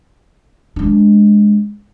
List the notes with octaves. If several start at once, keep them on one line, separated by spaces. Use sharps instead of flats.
G#3 D4